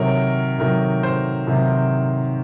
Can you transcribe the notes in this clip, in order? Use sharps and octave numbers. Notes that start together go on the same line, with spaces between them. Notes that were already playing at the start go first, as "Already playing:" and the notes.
Already playing: C3 D#3 F#3 A#4 C#5
C3 D#3 F#3 A#4
C5
C3 D#3 F#3